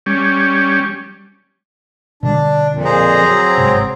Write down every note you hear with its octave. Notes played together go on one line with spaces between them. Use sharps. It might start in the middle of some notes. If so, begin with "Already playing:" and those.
G3 C#4
B2 D3 G3 D4
F2 A#2
G#4 C5 A#5
F#3 C4
G1 G#2 C3